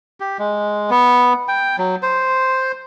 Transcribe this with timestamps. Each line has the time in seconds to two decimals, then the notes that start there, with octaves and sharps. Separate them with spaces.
0.20 G4
0.39 G#3
0.90 B3
1.48 G5
1.78 F#3
2.03 C5